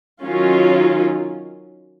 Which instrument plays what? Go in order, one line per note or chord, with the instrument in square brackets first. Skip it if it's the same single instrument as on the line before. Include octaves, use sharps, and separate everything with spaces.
[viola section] D#3 F#3 C#4 F4